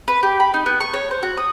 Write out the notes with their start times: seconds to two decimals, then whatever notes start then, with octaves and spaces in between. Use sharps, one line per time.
0.08 B4
0.23 G4
0.40 B5
0.54 D#4
0.66 B3
0.80 C#6
0.94 C#5
1.11 C5
1.23 F#4
1.37 D#6